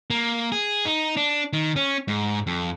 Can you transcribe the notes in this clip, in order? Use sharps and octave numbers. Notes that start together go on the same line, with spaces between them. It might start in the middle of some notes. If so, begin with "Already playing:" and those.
A#3
G#4
D#4
D4
D#3
C#4
G#2
F2